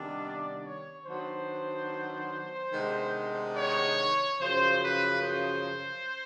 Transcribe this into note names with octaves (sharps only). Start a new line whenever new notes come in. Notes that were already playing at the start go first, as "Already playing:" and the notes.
Already playing: C3 D#3 G3 B3 D4
D5
C#5
D#3 F#3 B3 D4 C5
C3 D#3 G#3 B3 D4
C#5
F#2 C#3 F3 C5
B4
C5